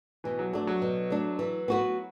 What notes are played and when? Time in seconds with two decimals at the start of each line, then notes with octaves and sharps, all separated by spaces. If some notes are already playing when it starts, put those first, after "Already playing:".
0.24 B2 E3
0.39 F#3
0.53 F#3 A3 D4
0.67 F#3
0.82 B2
1.10 A3 D4
1.39 E3
1.68 B3 F#4 B4